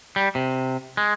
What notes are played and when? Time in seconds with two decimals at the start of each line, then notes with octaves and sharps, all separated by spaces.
0.16 G3
0.35 C3
0.97 G#3